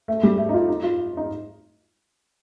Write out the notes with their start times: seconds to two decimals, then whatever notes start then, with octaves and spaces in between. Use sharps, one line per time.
0.08 A3
0.23 G3
0.38 A3
0.49 D#4
0.54 F4
0.68 D#4
0.83 F4
1.17 D#4